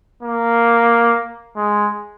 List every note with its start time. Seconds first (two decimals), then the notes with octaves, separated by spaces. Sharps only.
0.23 A#3
1.56 G#3